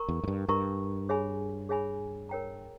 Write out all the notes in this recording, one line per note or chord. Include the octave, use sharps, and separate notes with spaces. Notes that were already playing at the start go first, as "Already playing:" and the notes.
Already playing: A#4 A#5 C#6
E2
G#2
G2
G2 A#4 E5 A#5 C#6
G#4 C#5 E5 G#5 B5
G#4 C#5 E5 G#5 B5
A#4 C#5 G5 A#5